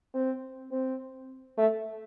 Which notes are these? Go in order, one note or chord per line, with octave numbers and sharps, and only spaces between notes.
C4
C4
A3